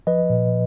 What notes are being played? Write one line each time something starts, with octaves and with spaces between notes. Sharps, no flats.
F3 B4 D#5
A#2